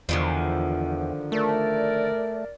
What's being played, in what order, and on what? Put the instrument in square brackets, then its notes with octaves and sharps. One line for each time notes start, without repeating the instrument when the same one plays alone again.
[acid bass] E2 [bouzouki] D3 D#3 F3
[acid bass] A3 [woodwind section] A#4 D5